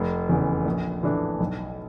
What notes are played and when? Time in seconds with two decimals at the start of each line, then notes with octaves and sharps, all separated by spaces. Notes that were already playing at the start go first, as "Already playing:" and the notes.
Already playing: F1
0.29 E2 C#3
0.66 A#1
1.03 A2 E3 A3 D4
1.40 B1